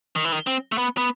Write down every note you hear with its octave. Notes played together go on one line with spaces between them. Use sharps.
D#3
E3
D#3
C4
A3
B3
B3